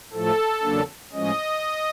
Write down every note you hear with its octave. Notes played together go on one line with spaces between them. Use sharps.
A2 F3 A3 A4
E2 C#3 F#3 A#3 D4
A2 F3 G#3 C#4 D#5